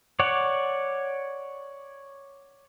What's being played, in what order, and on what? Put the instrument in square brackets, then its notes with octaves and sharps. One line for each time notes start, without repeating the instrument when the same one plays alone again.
[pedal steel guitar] C#5 D5 F#5